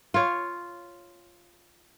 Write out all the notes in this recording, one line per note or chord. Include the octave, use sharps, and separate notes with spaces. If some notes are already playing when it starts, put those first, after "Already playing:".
F4 C#5